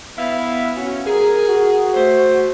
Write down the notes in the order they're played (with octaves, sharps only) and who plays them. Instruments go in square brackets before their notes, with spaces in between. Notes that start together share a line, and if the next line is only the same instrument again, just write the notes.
[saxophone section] B3 E4 F5
C#4 F#4
[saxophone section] G#4 [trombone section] A#4
[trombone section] F#4
[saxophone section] A3 C5